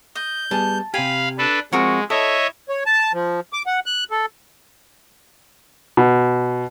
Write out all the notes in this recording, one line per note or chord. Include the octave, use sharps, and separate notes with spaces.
D#5 G6
G3 B3 G#4 A5
C3 G4 F5 G#5 B5
D4 A4 B4
F3 G#3 C4 F#4 A#4 C#6
E4 A4 C#5 D#5 E5
C#5
A5
F3
D6
F#5
F#6
A4
B2